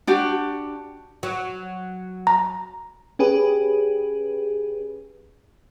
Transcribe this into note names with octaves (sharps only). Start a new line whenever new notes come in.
D4 F#4 G4
F#3
A#5
C#4 G4 G#4 B4